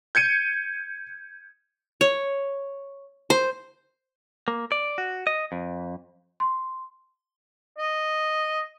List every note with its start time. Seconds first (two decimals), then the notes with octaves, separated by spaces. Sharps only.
0.15 G6 G#6 C#7 D#7
2.01 C#5
3.30 C5
4.48 A#3
4.72 D5
4.98 F#4
5.27 D#5
5.52 F2
6.40 C6
7.78 D#5